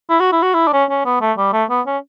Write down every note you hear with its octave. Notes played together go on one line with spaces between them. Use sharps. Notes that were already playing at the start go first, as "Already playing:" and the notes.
E4
F#4
E4
F#4
E4
D4
C#4
C#4
B3
A3
G3
A3
B3
C#4